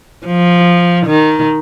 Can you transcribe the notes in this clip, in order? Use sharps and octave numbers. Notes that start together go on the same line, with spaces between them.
F3
D#3